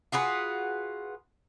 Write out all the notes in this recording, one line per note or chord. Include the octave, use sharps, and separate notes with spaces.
F4 F#4 G#4 B4